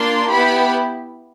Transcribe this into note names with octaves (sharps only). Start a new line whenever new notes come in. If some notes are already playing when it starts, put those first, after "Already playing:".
Already playing: A#3 D4 F4 C6
B3 E4 G4 B5